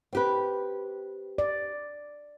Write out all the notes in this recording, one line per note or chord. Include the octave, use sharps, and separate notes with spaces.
C4 G4 B4
D5